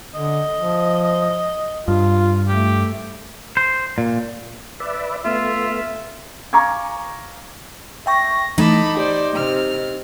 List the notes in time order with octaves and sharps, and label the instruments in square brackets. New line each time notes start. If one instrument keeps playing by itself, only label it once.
[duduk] D3 [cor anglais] D#5
[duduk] F3
[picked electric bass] G2 [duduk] F4
[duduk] A3 [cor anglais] G4
[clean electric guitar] C5
A#2
[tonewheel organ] B4 D5 E5
[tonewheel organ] A3 B3 [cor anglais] F4 [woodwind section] E5
[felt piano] F5 G#5 A#5 C#6 D6 G#6
[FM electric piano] E5 G5 C#6 [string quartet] A#6
[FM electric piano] E3 A3 [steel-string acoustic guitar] D#4 [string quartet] A5 B5 D6
[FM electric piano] G4 [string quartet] C5 D5
[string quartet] C3 F6